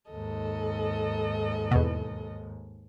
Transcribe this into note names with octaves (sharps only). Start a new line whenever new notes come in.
D#2 G#2 A4 D#5
E2 B2